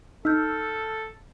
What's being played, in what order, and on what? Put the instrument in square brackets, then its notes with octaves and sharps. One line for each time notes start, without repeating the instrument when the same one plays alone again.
[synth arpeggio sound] D#4 [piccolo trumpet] A4 [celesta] E6 F6 G6